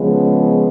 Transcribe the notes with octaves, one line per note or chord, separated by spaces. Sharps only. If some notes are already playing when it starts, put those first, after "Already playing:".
Already playing: C#3 F3 G#3 B3